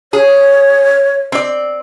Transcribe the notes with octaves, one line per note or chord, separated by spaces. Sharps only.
G#4 C#5
C4 D5